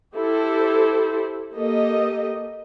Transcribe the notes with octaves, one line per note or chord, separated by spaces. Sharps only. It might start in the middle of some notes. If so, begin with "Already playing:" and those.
E4 G4 A4 C5
A#3 G4 A4 D#5